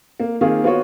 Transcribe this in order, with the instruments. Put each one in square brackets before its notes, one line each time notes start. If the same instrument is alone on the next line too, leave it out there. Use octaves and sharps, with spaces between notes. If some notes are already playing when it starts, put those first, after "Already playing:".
[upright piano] A#3
D#3 A#3 C4 F4 G#4
B3 F4 F#4 C#5